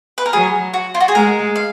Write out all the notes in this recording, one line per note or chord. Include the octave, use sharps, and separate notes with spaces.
B4
A#4
F#3 G#4
F#4
F4
F#4
G#4
G#3 A#4
F5